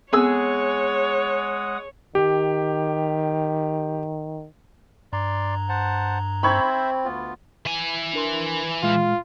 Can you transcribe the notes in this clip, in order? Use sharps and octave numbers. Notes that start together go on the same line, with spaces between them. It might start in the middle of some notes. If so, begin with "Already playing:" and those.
G#3 B3 C4 G#4 C#5 F#5 D#6 E6
D#3 G4
G2 D5 A#5 C6
C5 F#5 A5
C4 C5 E5 B5 C#6 G#6
D2 B3 F4
E3 G#5
D4 A#4 C6
A#2 G#3 F4 F6